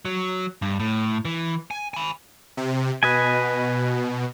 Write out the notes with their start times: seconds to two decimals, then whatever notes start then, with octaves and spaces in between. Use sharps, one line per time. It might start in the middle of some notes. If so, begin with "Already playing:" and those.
0.05 F#3
0.62 G2
0.80 A2
1.25 E3
1.71 G#5
1.94 G#5 B5
2.57 C3
3.03 B2 B4 D#5 G#5